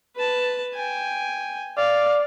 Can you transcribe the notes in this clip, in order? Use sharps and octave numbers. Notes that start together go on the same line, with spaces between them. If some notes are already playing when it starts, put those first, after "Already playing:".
B4 A5
G5 G#5
D5 F5